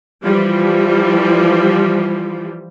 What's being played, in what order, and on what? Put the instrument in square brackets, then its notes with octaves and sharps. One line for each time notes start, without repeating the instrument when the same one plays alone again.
[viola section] E3 F3 G3